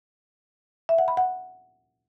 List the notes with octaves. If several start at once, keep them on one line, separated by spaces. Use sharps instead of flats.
E5
F#5
B5
F#5